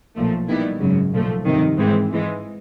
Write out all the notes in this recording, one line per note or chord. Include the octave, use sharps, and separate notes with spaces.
B1 A#2 F3 A3
D#3 G3 B3 E4
G#1 F#2 C#3 F#3
B1 A#2 F3 A3
G1 F2 C3 D#3
G#2 E3 G#3 C4
G#2 E3 G#3